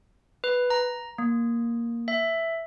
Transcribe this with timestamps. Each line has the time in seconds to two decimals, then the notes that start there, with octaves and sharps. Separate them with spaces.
0.44 B4
0.70 A#5
1.18 A#3
2.08 E5